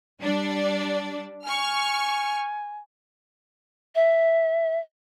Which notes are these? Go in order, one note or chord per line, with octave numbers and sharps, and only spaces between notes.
G3 D4 D5
G#5 C#6 F6
E5